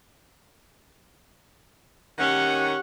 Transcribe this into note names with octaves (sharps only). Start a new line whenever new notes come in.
D#3 C#4 G4 F#5